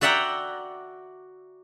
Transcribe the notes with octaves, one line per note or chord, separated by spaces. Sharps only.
F#4 D5 E5 F#5 G5 A#5